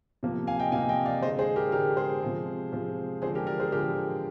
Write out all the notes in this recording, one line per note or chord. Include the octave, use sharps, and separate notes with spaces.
C3 F3 A#3
F5 G#5
D#5 G5
C3 F3 A#3 F5 G#5
D#5 G5
D5 F5
D3 G#3 C5 D#5
G#4 C5
G4 A#4
D3 G#3 G4 A#4
G#4 C5
C3 F3 G#3
C3 F3 G#3
D3 F3 G#3 G#4 C5
G4 A#4
A#4 D5
G#4 C5
D3 F3 G#3 G4 A#4